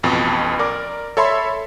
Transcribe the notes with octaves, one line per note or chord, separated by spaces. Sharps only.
A1 F2 B2
A#4 D5 D6
A4 C#5 E5 B5 C6